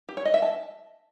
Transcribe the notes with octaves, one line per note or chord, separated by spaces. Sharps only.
G4
C#5
D#5
E5
A5